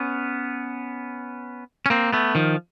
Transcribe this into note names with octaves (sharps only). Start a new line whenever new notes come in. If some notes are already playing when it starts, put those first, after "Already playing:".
Already playing: B3 C#4
C#4
A#3 C4
A3 B3
D#3 F3